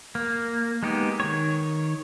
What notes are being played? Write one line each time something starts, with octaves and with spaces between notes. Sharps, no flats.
A#3
G#3 B3 D#4 G4
D#3 C#5